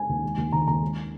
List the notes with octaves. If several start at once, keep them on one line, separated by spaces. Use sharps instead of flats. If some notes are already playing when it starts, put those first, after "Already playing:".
Already playing: G#3 G#5
D#2
G#3
D#2
D#3 A#5
D#2 A#5
G#3